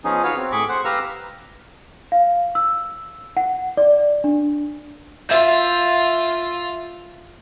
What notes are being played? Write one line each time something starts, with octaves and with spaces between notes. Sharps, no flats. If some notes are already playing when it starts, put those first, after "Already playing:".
F3 B3 C#4 D#4 G#4
F#4 B4 C#5 F5
C4
A2 G#4 B5 C#6 D6
C5 F#5
G4 B4 F5 A#5 E6 F6
F5
E6
F#5
D5
D4
F4 E5 G6